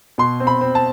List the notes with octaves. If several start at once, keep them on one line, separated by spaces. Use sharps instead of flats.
B2 C6
C4
B5
C4
A5